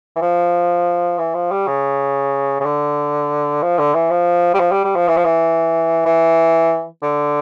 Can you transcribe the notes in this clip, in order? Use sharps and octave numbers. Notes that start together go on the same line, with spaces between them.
E3
F3
E3
F3
G3
C#3
C#3
D3
F3
D3
E3
F3
G3
F3
G3
G3
F3
E3
F3
E3
E3
D3